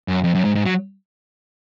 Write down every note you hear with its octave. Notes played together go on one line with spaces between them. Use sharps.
F#2
F2
F#2
G#2
G#2
F#3